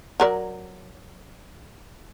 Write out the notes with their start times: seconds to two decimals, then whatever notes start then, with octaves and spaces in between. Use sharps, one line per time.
0.20 F#3 A#4 D5